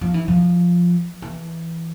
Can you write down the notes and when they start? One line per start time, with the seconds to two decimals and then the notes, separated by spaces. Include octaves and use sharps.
0.01 F3
0.14 E3
0.28 F3
1.22 E3